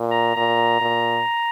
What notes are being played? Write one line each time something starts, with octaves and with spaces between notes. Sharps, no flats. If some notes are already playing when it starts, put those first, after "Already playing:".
Already playing: A#2
A#5
A#2 A#5
A#2